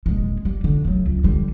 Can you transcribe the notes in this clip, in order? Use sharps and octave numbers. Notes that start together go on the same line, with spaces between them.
D#1 G#3
G3
D3
F#3 A3
C#2
D3 G3